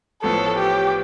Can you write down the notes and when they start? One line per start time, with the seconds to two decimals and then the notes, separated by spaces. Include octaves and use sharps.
0.22 A1 A2 F3 B3 A4
0.58 G4